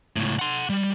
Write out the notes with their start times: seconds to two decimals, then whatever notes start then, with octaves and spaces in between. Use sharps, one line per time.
0.16 C#2 A2
0.39 F#5 C6
0.69 G3